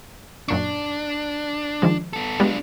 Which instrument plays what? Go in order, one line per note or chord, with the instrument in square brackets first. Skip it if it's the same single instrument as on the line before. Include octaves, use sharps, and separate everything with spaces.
[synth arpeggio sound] F#2 A#2 C#6 [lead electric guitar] D4
[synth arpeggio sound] D#3 F3 G#3
[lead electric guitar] B3 A4
[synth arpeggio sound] G3 G#3 B3 [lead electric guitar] D4 F4